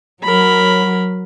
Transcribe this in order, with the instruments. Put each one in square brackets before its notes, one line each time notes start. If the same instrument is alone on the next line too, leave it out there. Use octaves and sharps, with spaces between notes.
[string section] F#3 [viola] A#4 B5